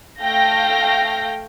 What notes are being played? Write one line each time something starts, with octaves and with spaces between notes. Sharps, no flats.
A3 F5 G5 G6 A#6